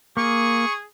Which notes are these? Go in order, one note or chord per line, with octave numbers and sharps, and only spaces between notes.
A#3 G#4 C#6